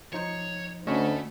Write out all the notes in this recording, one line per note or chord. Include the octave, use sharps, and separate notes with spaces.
F3 D#4 C5 C#5
D2 A3 C#4 D#5 F#5 B5